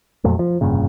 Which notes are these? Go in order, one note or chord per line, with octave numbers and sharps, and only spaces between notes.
F2 A#2 F#3 A3
F3
F1 G2 A#2 C#3